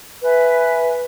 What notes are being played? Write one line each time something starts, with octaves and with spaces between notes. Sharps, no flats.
B4 E5 G#5